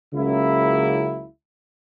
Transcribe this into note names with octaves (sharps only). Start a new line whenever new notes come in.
C#2 C#3 F#3 A#3 E4